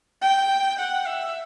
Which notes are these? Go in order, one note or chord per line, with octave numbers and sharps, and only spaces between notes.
G5
F#5
E5